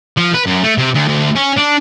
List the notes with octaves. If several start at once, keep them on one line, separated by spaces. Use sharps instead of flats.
F3
B4
F#2
A3
C3
D2
D2
C#4
D4